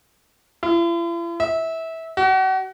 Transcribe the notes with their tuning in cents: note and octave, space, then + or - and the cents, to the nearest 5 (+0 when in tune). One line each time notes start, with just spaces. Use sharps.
E4 +45
E5 -20
F#4 +35